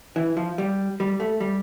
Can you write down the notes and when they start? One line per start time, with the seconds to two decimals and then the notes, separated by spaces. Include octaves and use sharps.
0.16 E3
0.37 F3
0.58 G3
1.00 G3
1.20 A3
1.40 G3